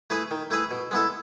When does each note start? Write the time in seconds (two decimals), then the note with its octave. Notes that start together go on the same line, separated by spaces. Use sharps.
0.10 A3 E4 G#4 B4
0.31 D#3
0.50 A3 E4 G#4 B4
0.71 B2
0.91 G#3 B3 E4 A4